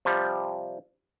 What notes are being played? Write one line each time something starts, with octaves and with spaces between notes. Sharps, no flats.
C3 F3 G3